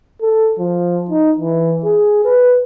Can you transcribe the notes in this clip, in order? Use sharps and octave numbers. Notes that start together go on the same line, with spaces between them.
A4
F3
D#4
E3
G#4
B4